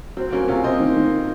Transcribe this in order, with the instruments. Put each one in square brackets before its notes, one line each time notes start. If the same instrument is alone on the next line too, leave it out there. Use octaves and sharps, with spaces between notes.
[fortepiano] F#3 [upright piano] C4
[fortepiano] F#3 [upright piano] A#3 C#4
[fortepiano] C3 [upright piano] C#4 F4
[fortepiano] C3 [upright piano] C5 D#5
[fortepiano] D#3
D#3